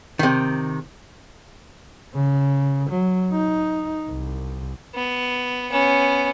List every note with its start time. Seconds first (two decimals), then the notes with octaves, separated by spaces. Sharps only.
0.19 C3 D#3
2.15 C#3
2.90 F#3
3.32 D#4
4.10 C2
4.95 B3
5.71 B3 C#4